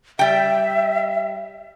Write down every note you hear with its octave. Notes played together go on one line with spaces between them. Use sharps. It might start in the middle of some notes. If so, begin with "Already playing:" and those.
G3 E5 G5